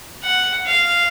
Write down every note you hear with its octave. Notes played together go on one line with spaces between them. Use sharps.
F#5
F5